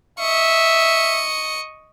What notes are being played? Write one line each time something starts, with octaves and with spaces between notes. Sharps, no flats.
D#5 E5 C#6